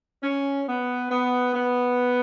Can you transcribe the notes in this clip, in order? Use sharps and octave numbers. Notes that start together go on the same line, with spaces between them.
C#4
B3
B3
B3